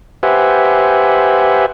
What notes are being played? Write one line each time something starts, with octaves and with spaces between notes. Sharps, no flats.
G4 B4 C5 E5 F#5 G#5